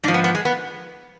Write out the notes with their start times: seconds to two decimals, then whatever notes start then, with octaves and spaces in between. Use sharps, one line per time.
0.04 G#2 D4
0.08 F3
0.14 B3
0.24 B3
0.35 G#3
0.45 B3